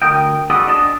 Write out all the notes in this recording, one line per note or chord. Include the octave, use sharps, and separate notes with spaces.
D2 A#4 D#5 G5
F#4 G#4 A4 B4 D5 D#5
D4 D#5 A5